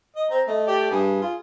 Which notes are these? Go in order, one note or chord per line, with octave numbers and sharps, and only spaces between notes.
D#5
C4 A#5
A3 D#5
G4 D5
G2 G#4
F4